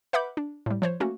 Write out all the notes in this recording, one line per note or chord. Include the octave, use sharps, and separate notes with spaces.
B4 E5 F#5 B5 D6 G6
D4
A2 G3
F3 C5 C#5
A3 A#3 C#4 F#4